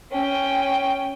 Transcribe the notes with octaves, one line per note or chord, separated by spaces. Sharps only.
C#4 G5